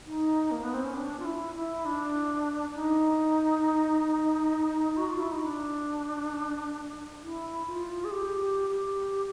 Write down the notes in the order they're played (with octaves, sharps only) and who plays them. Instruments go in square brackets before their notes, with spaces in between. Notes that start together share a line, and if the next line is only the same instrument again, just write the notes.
[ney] D#4
A#3
B3
C4
C#4
D4
F4
E4
E4
D4
D#4
F#4
F4
E4
D#4
D4
E4
F4
G#4
G4
G4
G4